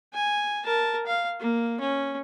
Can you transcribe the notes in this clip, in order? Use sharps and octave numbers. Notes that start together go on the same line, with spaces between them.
G#5
A#4 A5
F5
A#3
C#4